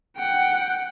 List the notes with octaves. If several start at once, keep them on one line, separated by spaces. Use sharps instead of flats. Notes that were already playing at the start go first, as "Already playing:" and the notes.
F#5 G5